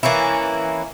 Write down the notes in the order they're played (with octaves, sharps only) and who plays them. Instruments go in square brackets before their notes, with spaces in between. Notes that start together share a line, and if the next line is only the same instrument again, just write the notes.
[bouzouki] E3 A#3 C#4 E4